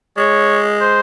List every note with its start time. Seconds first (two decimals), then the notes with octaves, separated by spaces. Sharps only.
0.17 G#3 C#5
0.81 C5